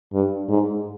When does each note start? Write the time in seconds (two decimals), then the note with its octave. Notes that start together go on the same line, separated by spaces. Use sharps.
0.13 G2
0.48 G#2